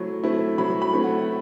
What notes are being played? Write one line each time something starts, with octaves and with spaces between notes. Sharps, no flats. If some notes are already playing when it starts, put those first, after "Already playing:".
Already playing: F#3 A3 C4 E4
A3 C4 E4
F#3 B5
B5
A3 C4 E4
F#5